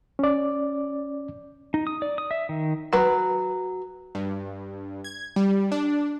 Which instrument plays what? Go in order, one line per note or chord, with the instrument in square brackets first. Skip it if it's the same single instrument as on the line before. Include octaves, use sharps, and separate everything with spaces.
[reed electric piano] C#4 D5
[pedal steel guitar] D#4
D#6
D5
D#6
E5
D#3
[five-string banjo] F#3 B4
[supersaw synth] G2
G#6
G3
D4